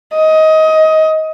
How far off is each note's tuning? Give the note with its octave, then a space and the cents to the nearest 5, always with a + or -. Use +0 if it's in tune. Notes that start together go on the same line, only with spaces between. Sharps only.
D#5 +20